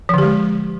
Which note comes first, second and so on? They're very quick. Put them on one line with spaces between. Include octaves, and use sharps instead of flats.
F3 D3 G4 G#3